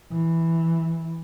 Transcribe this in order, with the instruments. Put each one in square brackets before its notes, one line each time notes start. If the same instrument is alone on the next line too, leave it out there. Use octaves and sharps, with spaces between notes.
[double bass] E3